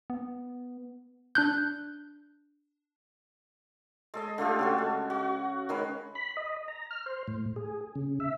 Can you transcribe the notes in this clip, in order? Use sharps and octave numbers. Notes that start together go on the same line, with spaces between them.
B3
D4 F#6 G6
G#3 A4 D#5
D3 A3 F4 G4
C#3 F#4 A4
G#3
F#4
D#3 G#3 C#4 B4
B5
D#5
A#5
F6
C5
A2
G#4
C#3
E5